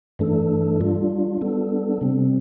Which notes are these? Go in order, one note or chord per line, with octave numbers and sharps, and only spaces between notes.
G2 E3 A3 D4 A4
G3 D4 F4
G3 B3 D4 A4
C3 G3 C4